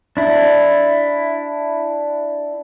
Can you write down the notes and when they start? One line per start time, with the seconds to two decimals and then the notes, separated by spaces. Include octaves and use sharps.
0.17 D4 E4